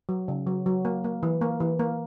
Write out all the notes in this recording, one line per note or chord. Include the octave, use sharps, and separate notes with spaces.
F#3
C#3
F#3
F#3
A#3
A#3
E3
A#3
E3
A#3